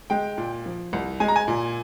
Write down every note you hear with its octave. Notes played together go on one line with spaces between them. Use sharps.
G#3 G5
A#2
F3
C2
G#3 G#5
A#5
G#5
A#2